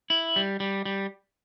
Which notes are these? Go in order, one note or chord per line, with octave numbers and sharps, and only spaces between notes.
E4
G3
G3
G3